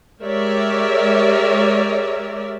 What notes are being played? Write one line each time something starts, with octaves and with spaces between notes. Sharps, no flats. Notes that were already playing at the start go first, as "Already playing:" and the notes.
G#3 G4 A#4 C#5 D5 E5